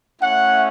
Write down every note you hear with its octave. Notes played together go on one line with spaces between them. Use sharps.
A3 C#4 E4 F#5